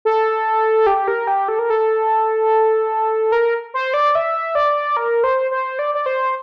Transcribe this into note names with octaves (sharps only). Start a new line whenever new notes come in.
A4
G4
A#4
G4
A4
A#4
A4
A#4
C5
D5
E5
D5
A#4
C5
C5
D5
D5
C5